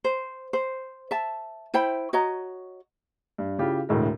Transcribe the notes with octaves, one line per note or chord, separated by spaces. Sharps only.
C5
C5
E5 A5
E4 C5 G5 B5
F#4 C#5 D#5 A#5
G2
C#3 E4 F4 G4
E1 D2 A2 G#3 E4 A#4